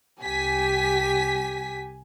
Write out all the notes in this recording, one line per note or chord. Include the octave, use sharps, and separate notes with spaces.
C2 G4 G#5 B6